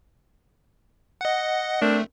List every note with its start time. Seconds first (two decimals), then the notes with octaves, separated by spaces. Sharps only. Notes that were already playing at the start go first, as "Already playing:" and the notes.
1.21 D#5 F#5
1.82 A3 C4 D4 A#4